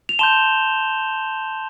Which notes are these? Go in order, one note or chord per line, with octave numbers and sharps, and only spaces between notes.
F7
A5 C6 G6 E7 G7